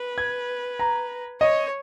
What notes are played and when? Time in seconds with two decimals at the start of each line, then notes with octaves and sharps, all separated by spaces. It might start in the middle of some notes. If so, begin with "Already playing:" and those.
Already playing: B4
0.18 G#6
0.79 A#5
1.41 C#5 D#5